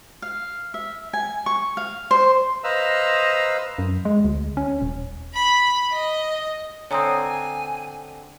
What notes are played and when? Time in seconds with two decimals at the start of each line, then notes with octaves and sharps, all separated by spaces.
0.22 F5
0.74 E5
1.13 G#5
1.46 C#6
1.77 F5
2.11 C5
2.64 B4 C5 D#5 F5 A#5 E6
3.79 F#2
4.05 G#3
4.25 D2
4.57 C#4
4.82 D#1
5.34 B5
5.92 D#5
6.91 D3 C4 C#5 G#5 A#5 D#6